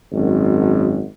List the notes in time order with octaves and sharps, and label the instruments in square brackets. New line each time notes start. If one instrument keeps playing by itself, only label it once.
[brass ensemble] G#1 F#2